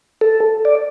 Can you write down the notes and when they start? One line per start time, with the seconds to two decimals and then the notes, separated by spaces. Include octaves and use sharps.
0.21 A4
0.65 D5